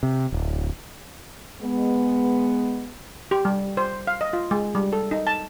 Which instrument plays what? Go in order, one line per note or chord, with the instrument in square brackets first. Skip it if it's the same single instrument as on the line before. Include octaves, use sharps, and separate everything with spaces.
[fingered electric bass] C3
D1
[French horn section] G#3 B3
[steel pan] G4
G3
C5
F5
D#5
F4
G#3
G3
A4
D#4
A5